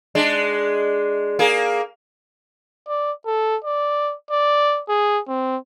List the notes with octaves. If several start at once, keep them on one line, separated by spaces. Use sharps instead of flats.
G#3 D4
A#3 G#4
D5
A4
D5
D5
G#4
C4